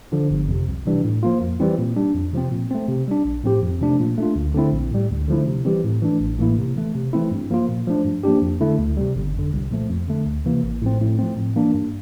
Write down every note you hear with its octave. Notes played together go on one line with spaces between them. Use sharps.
D3 F3
G1
F2 C3
C2
C3 E3 G3 D4
A2
F3 A#3 F4
F2
E3 G3 C4 E4
A#2
G3 D4
F2
C3 F3 C4
A#2
A3 C4
C3
G3 D4
A#1
A2 F3 C4 G4
F2
C3 F3 A3 D4
A#2
A3 D4 F4
D2
D3 A3 C4 E4
A#1
A2 G3
D2
D3 F3 A3 E4
C3
E3 G3 C4 G4
A2
E3 A3 D4
A1
A2 E3 A#3 E4
C3
E3 A3
C3
E3 A3 C4 E4
G2
F3 A#3 F4
A#2
F3 A3 D4
G2
F3 A#3 D4 G4
F2
D3 A3 E4
D2
C3 G3
G1
F2 D3
C2
A#2 F3 A3
F2
D3 A3
D2
C3 E3 A#3
A1
A2 F3 C4
A2
F3 A3 C4
A2
E3 A#3 D4
G2